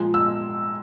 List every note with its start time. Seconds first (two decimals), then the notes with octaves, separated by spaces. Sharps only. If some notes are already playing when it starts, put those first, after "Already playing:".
Already playing: A#2 F3 G#3
0.14 E6